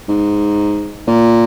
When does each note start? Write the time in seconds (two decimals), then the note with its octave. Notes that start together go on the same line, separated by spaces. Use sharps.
0.08 G#2
1.08 A#2